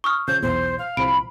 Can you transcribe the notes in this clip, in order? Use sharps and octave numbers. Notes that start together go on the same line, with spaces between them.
C#6 D#6 F6
C#3 F3 G6
B1 E2 C5
F5
C2 F3 B5 D7